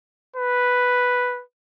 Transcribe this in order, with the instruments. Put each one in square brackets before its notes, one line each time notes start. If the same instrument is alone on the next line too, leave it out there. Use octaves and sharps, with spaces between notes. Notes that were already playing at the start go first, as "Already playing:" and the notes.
[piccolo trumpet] B4